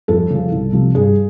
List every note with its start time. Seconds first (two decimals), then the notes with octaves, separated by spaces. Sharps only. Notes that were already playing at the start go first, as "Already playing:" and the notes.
0.08 F2 A4
0.30 C#3 F3
0.52 C2
0.73 C3 F3
0.95 G2 G#4